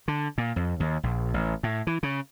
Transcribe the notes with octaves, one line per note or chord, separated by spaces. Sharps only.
D3
A#2
F2
D#2
A#1
A1
A2
E3
C#3